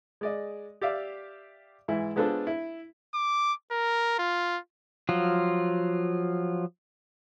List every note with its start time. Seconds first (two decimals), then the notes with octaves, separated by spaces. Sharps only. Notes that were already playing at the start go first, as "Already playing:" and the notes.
0.21 G#3 D5 D#5
0.81 G4 D5 E5 F5 D6
1.88 G#2 E3 E4
2.16 G#3 B3 D4 F4 A4 C5
2.47 E4
3.14 D6
3.72 A#4
4.19 F4
5.09 F3 F#3 F4